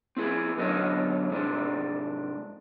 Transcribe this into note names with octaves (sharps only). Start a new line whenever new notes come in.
C4 E4 G#4
B2 D3 F#3 C#4 A4 D#5
G#2 C3 G#3 D4